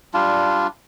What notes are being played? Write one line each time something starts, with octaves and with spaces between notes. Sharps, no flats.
G3 D4 F4